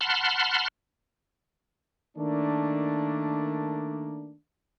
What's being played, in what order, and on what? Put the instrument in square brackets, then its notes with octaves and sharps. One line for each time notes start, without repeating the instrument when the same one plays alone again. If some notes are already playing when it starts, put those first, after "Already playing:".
[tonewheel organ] F#5 A5 B5 C6 F6
[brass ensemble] D#3 A3 A#3 D4